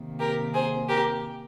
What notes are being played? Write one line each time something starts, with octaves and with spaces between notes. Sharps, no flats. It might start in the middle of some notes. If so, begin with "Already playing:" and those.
Already playing: C3 D#3 A#3
G4 A#4
G#4 C5
G4 A#4